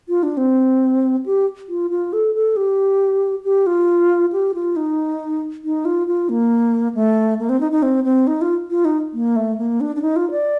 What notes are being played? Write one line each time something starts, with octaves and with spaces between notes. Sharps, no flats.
F4
D4
C4
G4
F4
F4
A4
A4
G4
G4
F4
G4
F4
D#4
D#4
F4
F4
A#3
A3
A#3
C4
D#4
D#4
C4
C4
D#4
F4
F4
D#4
A#3
A3
A#3
D4
D4
D#4
F4
D5